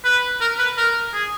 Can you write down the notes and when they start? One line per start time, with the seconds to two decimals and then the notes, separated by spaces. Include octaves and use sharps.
0.05 B4
0.41 A#4
0.59 B4
0.78 A#4
1.13 G#4